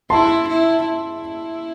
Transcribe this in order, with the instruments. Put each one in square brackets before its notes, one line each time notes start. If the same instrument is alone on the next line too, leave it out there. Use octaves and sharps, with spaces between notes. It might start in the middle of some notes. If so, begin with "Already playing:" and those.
[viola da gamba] E4 [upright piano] A5 C6
[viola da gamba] E4
E4